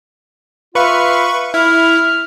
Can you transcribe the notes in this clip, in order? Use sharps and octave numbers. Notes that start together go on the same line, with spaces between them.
F4 B4 E5 F5 C#6
E4 F6